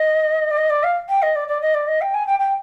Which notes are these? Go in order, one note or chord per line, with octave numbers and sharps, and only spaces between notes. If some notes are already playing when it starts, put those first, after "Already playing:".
Already playing: D#5
D5
D#5
D5
F5
G5
D#5
D5
D5
D#5
D5
D#5
G5
G#5
G5
G5